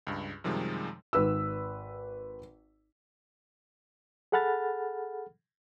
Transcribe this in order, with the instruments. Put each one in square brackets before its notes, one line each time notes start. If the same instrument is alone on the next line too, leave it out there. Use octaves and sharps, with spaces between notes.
[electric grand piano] C#2 G2
F#2 C3 D#3 F3 G3 G#3
[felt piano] G#1 B4 E6
[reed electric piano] G#4 A4 F#5 B5 F6 A6